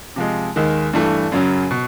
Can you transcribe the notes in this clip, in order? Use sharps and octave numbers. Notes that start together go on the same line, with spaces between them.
C3 F3 G#3
D#2 D#3 G#3
G2 E3 A3
F#2 C#3 F#3
B2